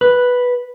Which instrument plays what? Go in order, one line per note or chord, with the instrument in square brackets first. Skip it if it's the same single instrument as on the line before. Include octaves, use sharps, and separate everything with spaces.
[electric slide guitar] B4